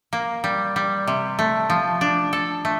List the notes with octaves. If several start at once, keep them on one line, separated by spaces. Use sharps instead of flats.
A#3
G3
G3
C3
A3
F3
D4
A4
A3